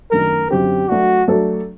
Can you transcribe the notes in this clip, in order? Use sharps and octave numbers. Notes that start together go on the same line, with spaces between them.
F#2 D#3 A3 D4 A#4
F#2 D3 F#3 C4 G4
F#3 A3 D4 F#4
F#3 A3 D4 A4